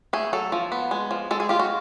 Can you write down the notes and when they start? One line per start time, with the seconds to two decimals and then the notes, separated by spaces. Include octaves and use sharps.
0.13 A3 G#4
0.33 F#3 A4
0.52 F3
0.72 B3
0.91 G#3
1.11 F3
1.31 G#3 A4
1.40 G#4
1.49 F4 G4
1.59 F#4